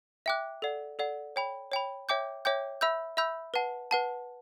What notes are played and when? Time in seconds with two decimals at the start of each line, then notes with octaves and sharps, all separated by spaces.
0.26 E5 G5 D6 F#6
0.62 A4 D5 F#5
0.99 A4 D5 F#5
1.36 C#5 G5 B5
1.72 C#5 G5 B5
2.09 C#5 E5 G5 D6 G6
2.45 C#5 E5 G5 D6 G6
2.81 E5 B5 E6 G6
3.17 E5 B5 E6 G6
3.54 B4 F#5 A5
3.91 B4 F#5 A5